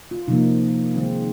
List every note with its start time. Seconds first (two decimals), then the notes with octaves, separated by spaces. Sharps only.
0.11 F4
0.27 C3 F3 A#3 D#4
0.96 D#3 G#3 C4